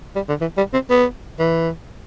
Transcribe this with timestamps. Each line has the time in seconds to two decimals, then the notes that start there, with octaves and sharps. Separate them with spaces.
0.15 G3
0.29 D3
0.41 E3
0.57 G3
0.73 C4
0.90 B3
1.39 E3